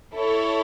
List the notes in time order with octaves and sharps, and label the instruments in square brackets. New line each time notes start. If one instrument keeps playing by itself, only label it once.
[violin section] E4 A4 C#5